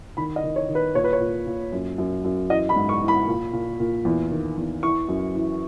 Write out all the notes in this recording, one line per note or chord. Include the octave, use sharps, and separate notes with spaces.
D#3 B5
D#5
D#3
C#5
D#3
B4
A#2 C#5
B4
C#5
A#2
A#2
F#2
F#2
F#2
E3 D#5
B5
G#2
C#6
E3
B5
A#2
A#2
A#2
E2
D#3
E2
E3 C#6
F#2
E3